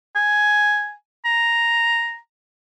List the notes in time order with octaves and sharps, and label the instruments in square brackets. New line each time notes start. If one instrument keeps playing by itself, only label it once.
[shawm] G#5
A#5